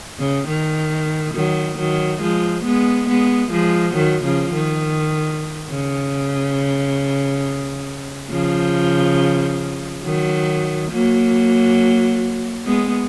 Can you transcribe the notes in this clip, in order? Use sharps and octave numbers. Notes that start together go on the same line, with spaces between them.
C#3
D#3
D#3 F#3
D#3 F#3
F3 G#3
G#3 B3
G#3 B3
F3 G#3
D#3 F#3
C#3 F3
D#3
C#3
C#3 F3
D#3 F#3
F#3 A#3
G#3 B3